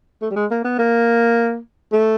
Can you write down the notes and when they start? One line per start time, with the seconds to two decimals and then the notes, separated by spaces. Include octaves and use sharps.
0.22 A3
0.31 G3
0.36 G#3
0.51 A#3
0.64 B3
0.79 A#3
1.93 A3